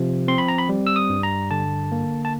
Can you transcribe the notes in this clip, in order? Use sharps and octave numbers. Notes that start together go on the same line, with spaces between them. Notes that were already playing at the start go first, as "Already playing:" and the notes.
Already playing: C3 F3
C4 C6
B5
A#5
B5
G3
E6
D#6
G2
A#5
D3 A5
A#3
A5